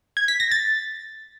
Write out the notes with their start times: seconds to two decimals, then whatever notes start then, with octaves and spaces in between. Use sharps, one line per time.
0.17 G#6
0.28 B6
0.40 A#6
0.51 A6